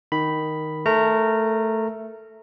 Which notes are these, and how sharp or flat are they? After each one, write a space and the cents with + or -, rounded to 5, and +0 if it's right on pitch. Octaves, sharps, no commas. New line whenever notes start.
D#3 +0 B5 +0
A3 +0 A#4 -15 A#5 -15